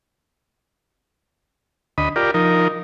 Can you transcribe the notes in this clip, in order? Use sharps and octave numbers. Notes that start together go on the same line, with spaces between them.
D2 D#5 B5
F4 G4 A#4 D5
F3 D#4 A#4